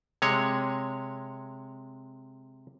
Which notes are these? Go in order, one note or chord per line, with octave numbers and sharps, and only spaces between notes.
C3 G#3 C#5